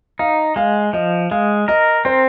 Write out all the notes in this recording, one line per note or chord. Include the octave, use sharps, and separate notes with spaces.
D#4 F5
G#3 F5
F3 D#5
G#3 F5
A#4 D#5
C4 C5